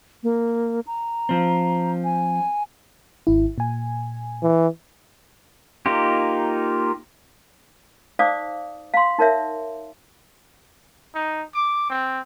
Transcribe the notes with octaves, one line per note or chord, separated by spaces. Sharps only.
A#3
A#5
F3 C4
G#5
G#1 E4
A#2 G#5
E3
A#3 D#4 F4 G4
D#4 C5 D5 F5 D6 D#6
F5 C6
D#4 A#4 C#5 E5
D#4
D6
C4